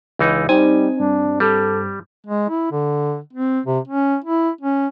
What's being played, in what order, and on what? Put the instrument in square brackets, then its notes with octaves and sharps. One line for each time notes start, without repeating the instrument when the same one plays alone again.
[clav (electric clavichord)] C#2 E3 D#4
[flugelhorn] G3 [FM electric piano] C4 [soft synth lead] D#4 [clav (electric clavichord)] G#5
[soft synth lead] G2 [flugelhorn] D4
[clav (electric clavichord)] G3 [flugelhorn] A4
[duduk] G#3
E4
D3
C4
C3
C#4
E4
C#4